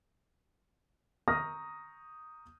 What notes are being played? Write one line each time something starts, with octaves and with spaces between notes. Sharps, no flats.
A#5 C#6 D#6 F6 A#6